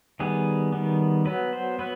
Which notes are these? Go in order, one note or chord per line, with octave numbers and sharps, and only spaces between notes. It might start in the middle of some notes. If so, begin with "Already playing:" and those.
D#3 G3 B3 G#4
D#3 G3 B3
F#3 B3 B4
C5
F#3 B3 B4